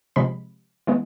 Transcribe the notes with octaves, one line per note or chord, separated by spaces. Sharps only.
C3 F3 G#3 B5
E3 G#3 B3